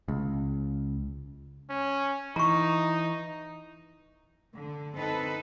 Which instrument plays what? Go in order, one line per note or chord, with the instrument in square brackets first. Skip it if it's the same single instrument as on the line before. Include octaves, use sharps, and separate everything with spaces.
[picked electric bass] C#2
[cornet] C#4
[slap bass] E3 [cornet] D#4 [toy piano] A#5 C#6
[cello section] D3
C4 D#4 A4 B4